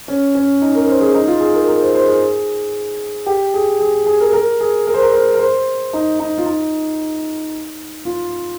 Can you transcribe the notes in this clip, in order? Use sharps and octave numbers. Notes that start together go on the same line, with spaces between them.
C#4
C#4
D#4
A#4
C5
G#4
D#4
F4
G#4
A#4
A#4
C5
C5
G#4
G4
G#4
G#4
G#4
A#4
A#4
G#4
A#4
C5
A#4
C5
A#4
C5
D#4
D#4
F4
D#4
F4